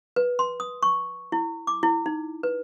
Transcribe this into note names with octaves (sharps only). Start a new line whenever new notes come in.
B4
C6
D#6
C#6
E4
D6
E4
D#4
B4